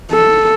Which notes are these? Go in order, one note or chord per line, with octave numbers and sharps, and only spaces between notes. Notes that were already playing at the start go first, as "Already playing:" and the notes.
A4